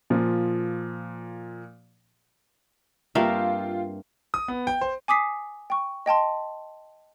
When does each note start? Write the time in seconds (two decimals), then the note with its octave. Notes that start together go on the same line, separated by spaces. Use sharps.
0.10 A#2 F3
3.15 G2 A#3 C4 F4 A#4 E5 F5 G5
4.34 D#6
4.48 B3
4.67 G5
4.81 C5
5.08 G#5 D6 D#6 B6 C7
5.70 G5 C#6
6.06 D#5 G5 A5 C6